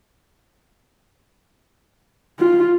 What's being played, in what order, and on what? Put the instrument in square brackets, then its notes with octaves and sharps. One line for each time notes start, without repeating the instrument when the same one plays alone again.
[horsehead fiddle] F4